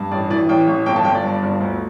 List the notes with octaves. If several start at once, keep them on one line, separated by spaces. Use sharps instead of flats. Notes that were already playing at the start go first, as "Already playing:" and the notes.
Already playing: G2
A1 D5
E3 D5
A1 G5
A1
G1 G5
A5
G1 G5
D5
G2
G1
D2